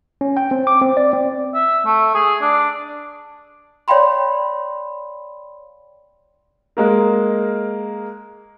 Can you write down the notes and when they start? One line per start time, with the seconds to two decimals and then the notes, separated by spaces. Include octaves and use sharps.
0.21 C#4
0.37 G5
0.51 C4
0.67 D6
0.81 C4
0.97 D5
1.13 C4
1.54 E5
1.85 A3
2.15 G#4
2.41 D4
3.88 C#5 D5 F5 G5 B5 C6
6.77 G#3 A#3 A#4